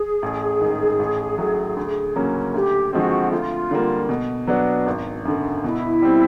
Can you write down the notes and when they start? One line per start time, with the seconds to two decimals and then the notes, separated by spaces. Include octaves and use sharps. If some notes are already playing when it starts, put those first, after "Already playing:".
Already playing: G#4
0.22 A1
0.61 G#2 D#3
0.99 A1
1.38 A2 F#3
1.77 D2
2.16 C#3 F#3 A#3 C#4
2.54 D2 G4
2.93 D3 F3 G#3 C4 F#4
3.31 D2 F4
3.71 D3 G3 A#3
4.09 B2
4.47 F#3 B3 D4
4.86 G#1
5.25 F#2 D3
5.64 B2 E4
6.02 G3 C4